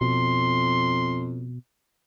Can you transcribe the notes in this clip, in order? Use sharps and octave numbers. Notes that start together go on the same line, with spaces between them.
F2 B2 C6